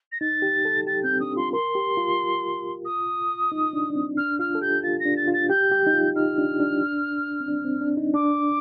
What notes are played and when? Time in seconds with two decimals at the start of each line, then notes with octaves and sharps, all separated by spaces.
0.12 A#6
0.21 D#4 A6
0.42 G4
0.65 A4
0.87 G4 A6
1.03 C4 G6
1.20 D4 D#6
1.37 F4 C6
1.53 A#4 C6
1.75 G4
1.97 F4
2.85 D#6
3.52 D#4
3.73 D4
3.90 D4
3.96 C4
4.17 D4 F6
4.39 F4 F6
4.55 A4
4.61 G4 G6
4.83 F4 A6
5.00 A#6
5.06 D4
5.17 A6
5.27 F4
5.33 A6
5.50 G4 G6
5.72 G4
5.86 D#4
5.93 F4
6.16 D#4 F6
6.38 D4
6.60 D4
7.40 C4
7.48 D4
7.65 C4
7.81 D4
7.97 D#4
8.14 D4 D6